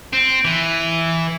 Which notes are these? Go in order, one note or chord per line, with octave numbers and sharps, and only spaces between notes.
C4
E3